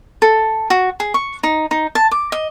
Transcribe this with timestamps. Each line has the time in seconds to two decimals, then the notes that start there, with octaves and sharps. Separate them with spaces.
0.22 A4
0.70 F#4
1.00 G#4
1.14 C#6
1.43 D#4
1.71 D#4
1.95 A5
2.11 D6
2.32 D#5